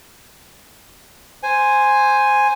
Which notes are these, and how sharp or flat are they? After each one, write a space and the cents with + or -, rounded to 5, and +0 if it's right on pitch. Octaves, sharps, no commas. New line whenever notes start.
C5 +0 G#5 +0